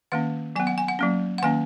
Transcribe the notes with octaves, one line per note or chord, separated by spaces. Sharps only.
D#3 A#3 C#4 F#5
F#3 B3 G#5
F#5
G#5
F#5
F#3 A#3 C#4
F#5
D#3 A#3 C#4 G#5